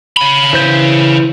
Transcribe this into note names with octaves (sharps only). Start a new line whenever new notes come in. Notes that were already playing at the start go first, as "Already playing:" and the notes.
C#3 B5
E3 C5 G6